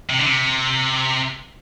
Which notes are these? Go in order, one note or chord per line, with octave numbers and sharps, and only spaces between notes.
C3
D3
C3